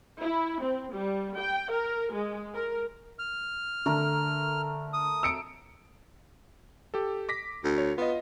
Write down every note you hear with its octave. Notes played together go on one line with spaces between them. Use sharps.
E4
C4
G3
G5
A#4
G#3
A#4
F6
D3 A3 A#4
D#6
E6 C#7 D7
G4 A4
D6 A#6 B6
D2
C#5
B3 F4 D#5